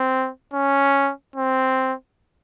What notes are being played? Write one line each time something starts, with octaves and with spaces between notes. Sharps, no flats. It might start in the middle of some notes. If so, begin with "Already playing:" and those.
Already playing: C4
C#4
C4